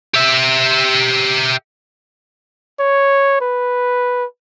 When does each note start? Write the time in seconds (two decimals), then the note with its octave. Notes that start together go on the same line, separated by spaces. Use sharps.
0.14 G4 E5
2.79 C#5
3.41 B4